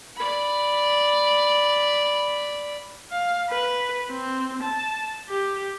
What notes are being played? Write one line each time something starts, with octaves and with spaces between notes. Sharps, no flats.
D5 B5
F5
B4
C4
A5
G4